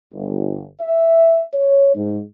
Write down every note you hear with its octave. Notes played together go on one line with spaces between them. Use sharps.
G1
E5
C#5
G#2